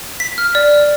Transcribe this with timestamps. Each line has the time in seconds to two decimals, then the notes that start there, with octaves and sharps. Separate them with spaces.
0.20 B6
0.38 F6
0.55 D5